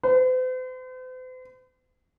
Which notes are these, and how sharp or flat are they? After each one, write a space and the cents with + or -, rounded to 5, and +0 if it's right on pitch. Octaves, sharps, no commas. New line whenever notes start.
C5 -45